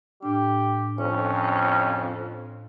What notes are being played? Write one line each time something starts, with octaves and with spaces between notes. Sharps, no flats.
A2 D4 G4
F2 C#4 C#5